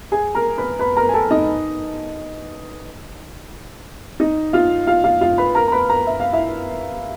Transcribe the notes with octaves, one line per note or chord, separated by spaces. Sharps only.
G#4 G#5
A#4 A#5
B4 B5
B4 B5
A#4 A#5
G#5
A4 A5
D#4 D#5
D#4 D#5
F4 F5
F4 F5
F4 F5
F4 F5
B4 B5
A#4 A#5
A#5
B4 B5
A#4 A#5
E5
F5
E4 E5